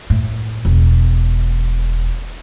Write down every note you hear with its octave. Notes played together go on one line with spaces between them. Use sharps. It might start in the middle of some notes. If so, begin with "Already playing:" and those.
A2
E1